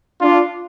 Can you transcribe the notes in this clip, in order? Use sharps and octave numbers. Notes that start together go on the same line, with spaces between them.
D4 F4